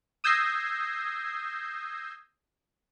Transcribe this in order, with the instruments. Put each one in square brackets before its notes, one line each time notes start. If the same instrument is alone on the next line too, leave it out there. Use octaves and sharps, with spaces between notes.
[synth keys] D#6 E6 G6 G#6 A#6 C7